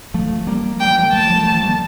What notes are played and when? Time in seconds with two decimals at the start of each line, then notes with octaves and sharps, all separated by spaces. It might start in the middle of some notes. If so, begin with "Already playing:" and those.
0.14 F3 A3
0.47 G3 A#3
0.80 G5
0.85 F3
0.99 G3
1.13 F3 A3 A5
1.30 F3 A3
1.46 F3 A3
1.63 G3 A#3